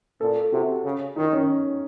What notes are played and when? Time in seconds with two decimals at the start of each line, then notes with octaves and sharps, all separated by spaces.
0.21 A#2 A4
0.52 C3 F#4
0.84 C#3
1.16 D#3 D#4
1.33 C#4